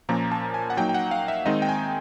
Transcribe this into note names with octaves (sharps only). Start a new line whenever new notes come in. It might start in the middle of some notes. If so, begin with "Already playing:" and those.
A#2 F3 A#3 C#4 A#5
A5
G#5
F#5
F#3 A#3 D#4 G5
G5
F#5
F5
E5
D#3 G#3 C4 D#4 D#5
G5
G#5